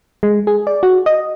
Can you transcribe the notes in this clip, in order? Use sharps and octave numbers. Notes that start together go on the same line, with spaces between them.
G#3
G#4
D5
F#4
D#5